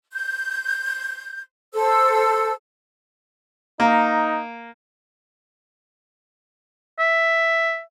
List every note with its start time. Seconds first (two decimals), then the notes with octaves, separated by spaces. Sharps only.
0.13 G6
1.74 A4 C5 E6
3.80 A#3 D#4
6.99 E5